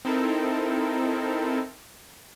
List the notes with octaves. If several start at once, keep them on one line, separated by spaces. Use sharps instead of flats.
C4 D#4 E4 A4 A#4